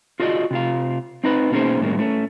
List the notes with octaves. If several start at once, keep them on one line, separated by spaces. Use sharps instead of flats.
F4 F#4 G#4 D5 D#5
C3 F4 F5
C4 D#4 B4
B2 A#3 C#4 D#4 G#4 C5
A2 D#3 G3 G#3 A#3
A3 C#4